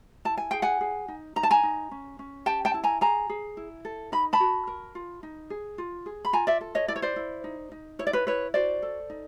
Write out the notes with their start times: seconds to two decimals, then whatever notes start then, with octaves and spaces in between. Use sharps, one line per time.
0.25 E4 A5
0.37 G#5
0.51 G#4 G5
0.62 F#5 G#5
0.81 G#4
1.08 D#4
1.36 D#4 A#5
1.43 A5
1.51 G#5 A#5
1.63 D#4
1.91 C#4
2.19 C#4
2.46 G4 G5 A5
2.65 G5 A5
2.74 E4
2.84 G#5 A#5
3.01 G#4 G#5 A#5
3.29 G#4
3.57 E4
3.85 A4
4.12 D#4 B5
4.33 A5 B5
4.40 F#4
4.67 A#4
4.95 F4
5.23 D#4
5.50 G#4
5.78 F4
6.06 G#4
6.25 B5
6.33 F4 G#5 A#5
6.47 D5 E5
6.61 A4
6.75 C#5 D#5
6.88 E4 D5
6.96 C#5
7.02 C5 D5
7.16 E4
7.44 D#4
7.72 D#4
7.99 E4 C#5
8.07 D5
8.13 B4 C#5
8.27 E4 B4 C#5
8.54 F#4 C5 D5
8.82 A4
9.10 D#4